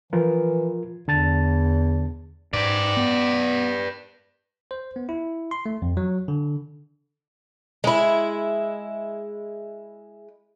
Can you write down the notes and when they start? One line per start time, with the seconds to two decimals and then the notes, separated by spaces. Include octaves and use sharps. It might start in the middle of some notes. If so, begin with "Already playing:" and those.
0.13 E3 F3 F4 A#4
1.08 E2 D3 A5 A6
2.53 G#2 B4 D5
2.97 B3
4.71 C5
4.96 B3
5.09 E4
5.51 C6
5.66 A3
5.82 F2
5.97 F#3
6.28 D3
7.84 G#3 E4